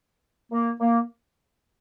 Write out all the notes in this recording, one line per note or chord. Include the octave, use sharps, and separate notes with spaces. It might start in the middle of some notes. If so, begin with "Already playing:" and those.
A#3
A#3